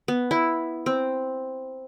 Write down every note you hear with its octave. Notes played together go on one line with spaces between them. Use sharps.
B3
E4
C4